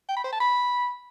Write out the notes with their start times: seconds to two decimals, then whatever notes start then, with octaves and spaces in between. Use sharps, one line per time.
0.08 G5
0.16 B5
0.24 C5
0.32 A5
0.40 B5